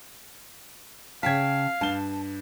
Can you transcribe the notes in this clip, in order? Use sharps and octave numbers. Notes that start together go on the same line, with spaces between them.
C#3 F5 G5 A5 G#6 B6
G2 A5 G7